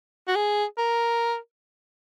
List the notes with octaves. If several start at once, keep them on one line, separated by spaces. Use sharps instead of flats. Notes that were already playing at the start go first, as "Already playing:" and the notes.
F#4
G#4
A#4